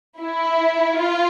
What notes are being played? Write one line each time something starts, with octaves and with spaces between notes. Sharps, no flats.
E4
F4